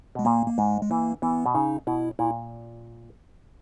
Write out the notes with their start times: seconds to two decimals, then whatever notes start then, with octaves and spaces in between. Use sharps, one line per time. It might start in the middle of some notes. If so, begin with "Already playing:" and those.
0.15 B2 G#3
0.25 A#2 A#3
0.47 A#3
0.58 G#2 G#3
0.82 G#3
0.91 E3 A#3
1.22 E3 B3
1.46 B2
1.55 C#3 D#4
1.87 B2 E4
2.19 A#2 E4